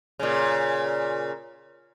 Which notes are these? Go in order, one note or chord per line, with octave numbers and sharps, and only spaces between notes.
A#2 C#3